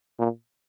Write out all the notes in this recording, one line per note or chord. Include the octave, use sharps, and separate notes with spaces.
A#2